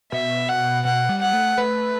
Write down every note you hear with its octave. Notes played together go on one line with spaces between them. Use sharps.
B2 E5
F#5
B2 F#5
G3
F#5
A3
A3 B4